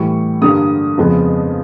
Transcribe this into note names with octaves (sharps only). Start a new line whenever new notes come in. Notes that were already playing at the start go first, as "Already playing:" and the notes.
Already playing: A2 E3 G3 C#6
G2 D3 G3 A#3 D#6
F2 C#3 F3 G#3 B3